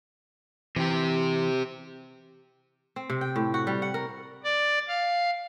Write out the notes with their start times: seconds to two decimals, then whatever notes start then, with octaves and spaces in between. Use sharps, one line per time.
0.76 C3 E3 G4
2.96 C4
3.10 C3
3.21 G5
3.36 A2
3.54 F#4
3.67 G3
3.82 F#5
3.94 A#4
4.44 D5
4.88 F5